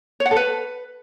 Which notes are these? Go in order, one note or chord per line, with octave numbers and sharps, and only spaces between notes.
C#5
F#5
A4
B4